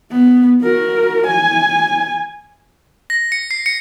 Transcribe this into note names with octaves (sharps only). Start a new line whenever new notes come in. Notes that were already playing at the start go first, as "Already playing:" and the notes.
B3
F#4 A#4
G#5
A#6
C#7
C7
C#7